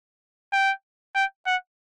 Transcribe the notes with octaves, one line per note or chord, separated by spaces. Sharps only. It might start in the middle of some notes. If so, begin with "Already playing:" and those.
G5
G5
F#5